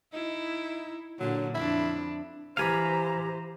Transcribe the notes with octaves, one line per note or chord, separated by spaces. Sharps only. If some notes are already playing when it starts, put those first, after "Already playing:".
D#4 E4
A#2 D3 F#3
F2 D4 E4
E3 G4 C5 F5 G#5 A#5 B5